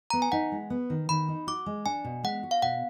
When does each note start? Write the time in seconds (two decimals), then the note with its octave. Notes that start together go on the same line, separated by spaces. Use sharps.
0.10 B3 A#5
0.22 G#5
0.32 D#4 F#5
0.52 G#3
0.70 B3
0.90 D#3
1.09 D#3 B5
1.28 D#4
1.47 F#4 D6
1.66 G#3
1.86 D4 G#5
2.04 B2
2.23 G#3 F#5
2.43 F#4
2.51 F5
2.62 B2 F#5